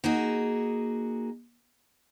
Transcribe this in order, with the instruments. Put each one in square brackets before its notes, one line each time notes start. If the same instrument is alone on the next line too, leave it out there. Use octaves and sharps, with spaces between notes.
[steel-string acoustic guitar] A#3 D#4 F#4 G#4